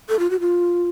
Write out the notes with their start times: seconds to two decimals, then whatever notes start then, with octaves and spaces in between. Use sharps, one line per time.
0.09 A4
0.19 F4
0.30 F#4
0.40 F4